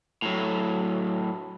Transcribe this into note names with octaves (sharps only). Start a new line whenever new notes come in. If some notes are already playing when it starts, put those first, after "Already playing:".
A2 F#3